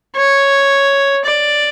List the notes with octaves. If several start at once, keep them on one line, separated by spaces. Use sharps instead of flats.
C#5
D5